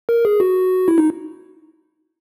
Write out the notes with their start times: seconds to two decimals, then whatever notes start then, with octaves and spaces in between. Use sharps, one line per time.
0.09 A#4
0.25 G#4
0.40 F#4
0.88 E4
0.98 D#4